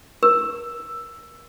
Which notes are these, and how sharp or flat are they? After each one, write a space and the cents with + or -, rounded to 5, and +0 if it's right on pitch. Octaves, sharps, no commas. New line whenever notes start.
A#4 +30